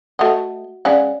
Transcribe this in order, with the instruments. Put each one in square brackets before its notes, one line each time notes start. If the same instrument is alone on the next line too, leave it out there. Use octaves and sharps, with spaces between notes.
[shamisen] A3 D#5 [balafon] F#4 F#5
[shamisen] G#3 C#4 F#5 [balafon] D5 F5